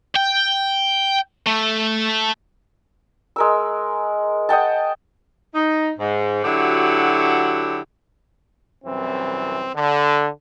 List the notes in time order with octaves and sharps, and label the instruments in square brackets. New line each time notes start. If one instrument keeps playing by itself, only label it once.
[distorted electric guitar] G5
A3
[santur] G#3 A#4 E6
D#5 F#5 G5 A5
[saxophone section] D#4
G#2
D3 F#3 E4 F#4 G4
[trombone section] C2 F#2 E3 C4
D3